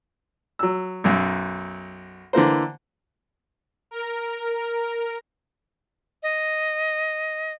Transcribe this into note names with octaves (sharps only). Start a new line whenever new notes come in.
F#3 E6
B1 F#2
D3 E3 A#3 C5
A#4
D#5